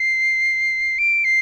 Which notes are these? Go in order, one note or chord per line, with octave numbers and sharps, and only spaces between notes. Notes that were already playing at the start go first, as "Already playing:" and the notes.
Already playing: C7
D7
C7